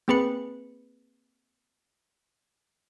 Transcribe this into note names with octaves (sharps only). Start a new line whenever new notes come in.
A#3 C4 G#4 B4 B5 C#7